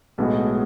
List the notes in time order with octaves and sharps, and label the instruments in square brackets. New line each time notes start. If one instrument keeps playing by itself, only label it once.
[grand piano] B1 A2 G#3 B3 F#4